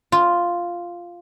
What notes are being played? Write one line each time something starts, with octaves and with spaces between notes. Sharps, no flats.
F4